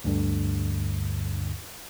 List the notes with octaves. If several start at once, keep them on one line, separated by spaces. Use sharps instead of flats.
D2 G2 D3